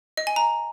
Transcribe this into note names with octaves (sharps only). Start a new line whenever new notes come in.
D#5
G#5
A#5